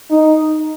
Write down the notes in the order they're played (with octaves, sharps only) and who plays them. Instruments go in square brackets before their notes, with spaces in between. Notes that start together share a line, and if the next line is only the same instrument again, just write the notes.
[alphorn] D#4